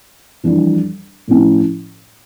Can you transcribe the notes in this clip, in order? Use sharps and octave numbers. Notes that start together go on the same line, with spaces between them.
F2 E3 G3 D4
A2 F3 C#4 E4